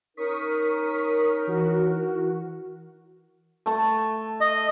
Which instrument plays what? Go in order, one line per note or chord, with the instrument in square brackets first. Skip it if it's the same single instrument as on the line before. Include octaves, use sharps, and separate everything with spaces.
[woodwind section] C#4 D#4 A#4 [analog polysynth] C#6 D#6 B6
[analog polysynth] E3 F#4
[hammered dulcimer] A3 A5
[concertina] D#5